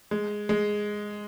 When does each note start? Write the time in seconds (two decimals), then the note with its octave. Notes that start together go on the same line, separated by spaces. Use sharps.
0.11 G#3
0.49 G#3